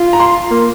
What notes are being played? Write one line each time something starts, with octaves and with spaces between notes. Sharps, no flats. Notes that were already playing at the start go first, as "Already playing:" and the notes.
Already playing: F4
A#5
C6
A#3